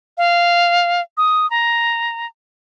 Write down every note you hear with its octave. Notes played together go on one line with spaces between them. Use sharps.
F5
D#6
A#5